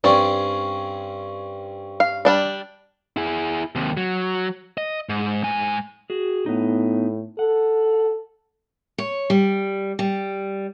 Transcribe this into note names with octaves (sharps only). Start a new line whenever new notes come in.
G2 C4 C#4 D5
F5
G3 D4 D5
E4 G#4
D#2 C3
F#3
D#5
G#2
G#2 G#5
F#4 G#4
A2 B3 D#4
A4 F#5
C#5
G3
G3